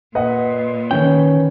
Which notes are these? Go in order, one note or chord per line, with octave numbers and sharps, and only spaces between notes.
A#2 B4 D#5 F#5
D#3 G3 C#4 B4 G5